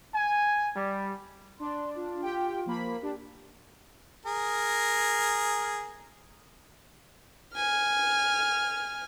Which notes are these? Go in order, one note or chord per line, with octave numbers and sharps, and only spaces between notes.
G#5
G3
D4 C6
F4
G4 G5
F3 A#3 B5
D4 G4
G#4 A#4
G#5 F6